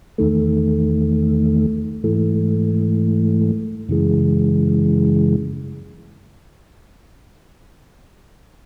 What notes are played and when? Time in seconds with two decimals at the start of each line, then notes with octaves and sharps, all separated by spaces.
0.18 E2 D#3 A3
2.04 G#2 E3 A3
3.88 F#2 C#3 E3 G#3